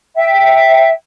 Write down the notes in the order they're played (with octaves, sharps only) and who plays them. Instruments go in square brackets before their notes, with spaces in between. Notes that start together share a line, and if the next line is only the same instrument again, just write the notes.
[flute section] E5 G5